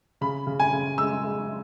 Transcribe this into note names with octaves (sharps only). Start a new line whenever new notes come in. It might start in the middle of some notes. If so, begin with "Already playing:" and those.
C#3 B5
C#3
G#5
C#3
G#3 E6
G#3